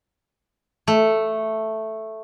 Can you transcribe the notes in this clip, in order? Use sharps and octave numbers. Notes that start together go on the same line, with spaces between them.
A3